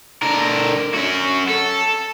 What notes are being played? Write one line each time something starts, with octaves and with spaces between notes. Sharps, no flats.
D3 A#4
C#4 F#4
A4